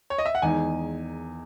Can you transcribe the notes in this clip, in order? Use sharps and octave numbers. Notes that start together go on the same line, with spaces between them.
C#5
D#5
E5
F#5
E2 D#3 G#3 B3 D#4 G#5